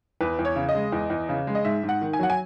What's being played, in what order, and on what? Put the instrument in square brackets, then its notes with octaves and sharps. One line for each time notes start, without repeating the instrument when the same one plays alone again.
[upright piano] E2 B4
E2
C#5
C#3
D#5
G#3
E2
E2
C#3
G#3
D#5
G#2 E5
G#2
F#5
D#3
G#5
F#3 F#5
G#5